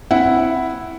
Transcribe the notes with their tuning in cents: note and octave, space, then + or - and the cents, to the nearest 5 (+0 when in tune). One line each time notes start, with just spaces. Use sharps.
C4 +0 E4 +0 F#5 +0